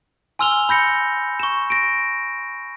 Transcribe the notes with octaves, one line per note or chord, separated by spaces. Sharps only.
G#5 C6 E6 F6 F7 G7
B5 G6 A#6 C#7
C#6 E7
A#6 D7